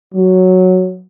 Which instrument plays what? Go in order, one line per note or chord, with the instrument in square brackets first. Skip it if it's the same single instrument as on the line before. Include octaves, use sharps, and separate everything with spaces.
[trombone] F#3